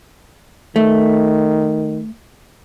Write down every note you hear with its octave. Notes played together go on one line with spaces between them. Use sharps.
D#3 A3